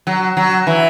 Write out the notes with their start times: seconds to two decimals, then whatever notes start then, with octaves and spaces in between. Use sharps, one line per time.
0.07 F#3
0.37 F#3
0.67 E3